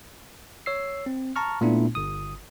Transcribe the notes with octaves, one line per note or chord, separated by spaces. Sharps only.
C#5 E6 C7
C4
A5 A#5 C#6 F6
A#2 A3 B3 D4 E4
G1 D#6